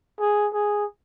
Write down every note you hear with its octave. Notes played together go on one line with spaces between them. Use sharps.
G#4
G#4